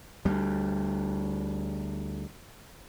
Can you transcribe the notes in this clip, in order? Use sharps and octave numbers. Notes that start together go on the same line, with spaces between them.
D2 G3